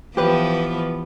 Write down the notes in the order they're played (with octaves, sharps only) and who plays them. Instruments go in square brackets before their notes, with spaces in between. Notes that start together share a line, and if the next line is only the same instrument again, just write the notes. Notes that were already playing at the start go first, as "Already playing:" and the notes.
[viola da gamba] E3 F3 B3 [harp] G4 B4